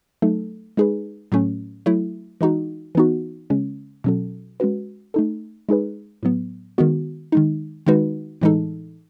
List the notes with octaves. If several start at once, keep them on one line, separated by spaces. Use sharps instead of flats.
F#3 A3 D#4 A4
G#3 D#4 G#4 B4
A2 F#3 A3 C#4
F#3 A3 E4
E3 G#3 D#4 F#4
E3 B3 D#4 F#4
C#3 G#3 C#4
B2 F#3 C#4 F#4 A4
G#3 C#4 F#4 B4
A3 D#4 A4
G#3 D#4 G#4 B4
A2 F#3 B3
D#3 G#3 B3 F#4
D#3 G#3 D#4
D#3 G#3 D#4 F#4 B4
A2 E3 G#3 D#4 A4